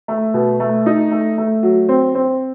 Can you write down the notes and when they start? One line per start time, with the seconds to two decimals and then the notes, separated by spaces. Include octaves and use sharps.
0.08 A3
0.34 B2
0.60 A3
0.86 D#4
1.11 A3
1.38 A3
1.63 F#3
1.89 C4
2.15 C4